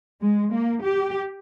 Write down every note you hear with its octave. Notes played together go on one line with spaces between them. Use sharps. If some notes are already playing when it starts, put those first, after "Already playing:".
G#3
A#3
G4